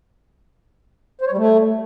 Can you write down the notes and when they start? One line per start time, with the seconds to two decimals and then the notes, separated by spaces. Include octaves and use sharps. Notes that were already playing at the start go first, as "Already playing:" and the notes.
1.21 C5
1.27 C#5
1.32 G3
1.37 A3